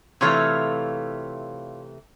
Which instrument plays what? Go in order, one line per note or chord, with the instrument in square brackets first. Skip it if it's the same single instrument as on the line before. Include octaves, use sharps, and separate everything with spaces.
[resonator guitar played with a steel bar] C3 E3 A3 [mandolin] F4 C#5 F5